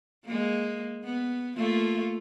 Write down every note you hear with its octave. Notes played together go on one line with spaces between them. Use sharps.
G#3 A#3
B3
A3 A#3 F4